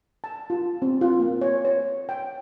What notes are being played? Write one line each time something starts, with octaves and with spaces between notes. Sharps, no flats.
A5
F4
C4
F4
A#3
C#5
C#5
G5